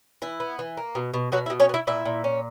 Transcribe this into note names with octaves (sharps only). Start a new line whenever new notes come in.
E3 E4
B3
E3
A#3
B2
B2
B2 F#3 F#4
E4
B2
C#4 C#5
B3
E4 E5
A#2 E4 E5
A#2
C#4